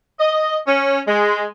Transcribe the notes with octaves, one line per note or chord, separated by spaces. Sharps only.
D#5
C#4
G#3